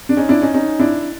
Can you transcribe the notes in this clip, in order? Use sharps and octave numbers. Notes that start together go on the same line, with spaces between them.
D4
C#4 D#4
D4 E4
C#4 D#4
C#4 D#4
D4 E4